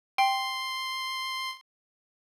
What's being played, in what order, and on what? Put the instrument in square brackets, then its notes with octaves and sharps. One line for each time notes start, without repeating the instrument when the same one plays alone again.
[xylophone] G5 [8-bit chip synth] C6